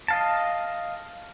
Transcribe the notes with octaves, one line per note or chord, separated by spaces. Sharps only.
D#5 F5 A5